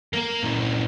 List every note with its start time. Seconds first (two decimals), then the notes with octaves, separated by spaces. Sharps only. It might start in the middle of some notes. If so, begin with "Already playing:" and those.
0.13 A#3 A#4
0.43 A#2 E3